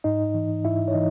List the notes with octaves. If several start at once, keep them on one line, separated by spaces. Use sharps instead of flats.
G#2 D#4 D#5
E3
G#2 E4 E5
C#5
E3 D#4 D#5